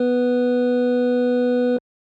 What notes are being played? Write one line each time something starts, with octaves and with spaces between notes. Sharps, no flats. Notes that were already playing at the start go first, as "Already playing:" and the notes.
Already playing: B3 B4